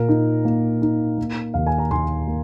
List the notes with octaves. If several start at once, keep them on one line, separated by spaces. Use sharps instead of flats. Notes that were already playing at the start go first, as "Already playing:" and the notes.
Already playing: A#2 A#4
D#4
A#3
D#4
A#3
D#2 F5
G#5
A#5
D#2 G#5 C6
A#3